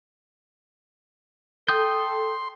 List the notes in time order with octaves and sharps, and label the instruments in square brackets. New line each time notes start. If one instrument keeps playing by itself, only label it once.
[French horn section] A4 [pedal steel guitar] G5 D#6 G6 [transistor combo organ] C6